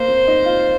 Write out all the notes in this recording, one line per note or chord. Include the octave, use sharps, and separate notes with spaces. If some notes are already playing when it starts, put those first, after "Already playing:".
Already playing: A#3 C5
C4
D#4
F4